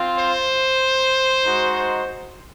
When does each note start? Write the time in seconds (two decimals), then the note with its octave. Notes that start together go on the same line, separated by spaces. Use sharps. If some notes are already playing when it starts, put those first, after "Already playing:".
Already playing: C4 F4
0.17 C5
1.45 G#3 D#4 F#4